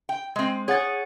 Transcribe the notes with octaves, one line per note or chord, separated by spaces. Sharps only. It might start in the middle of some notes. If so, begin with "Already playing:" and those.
G5
G#3 C4
G#4 C#5 F#5 A6